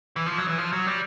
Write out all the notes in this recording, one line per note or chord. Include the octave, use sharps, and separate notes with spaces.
E3
F3
F#3
E3
F3
F#3
G3